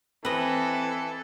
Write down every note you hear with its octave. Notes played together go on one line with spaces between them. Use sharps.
E3 C4 A4 B4 D#5